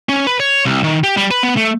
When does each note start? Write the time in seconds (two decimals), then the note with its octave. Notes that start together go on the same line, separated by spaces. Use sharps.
0.09 C#4
0.27 B4
0.40 C#5
0.65 C2
0.84 D#3
1.04 G4
1.17 G3
1.31 B4
1.43 B3
1.57 A3